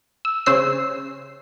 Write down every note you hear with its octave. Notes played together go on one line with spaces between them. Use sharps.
E6
C#3 C5 C#5 E6 C7